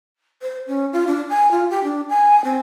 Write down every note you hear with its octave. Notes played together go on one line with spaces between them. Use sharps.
C5
C#4
F4
D4
G#5
F4
G4
D4
G#5
C4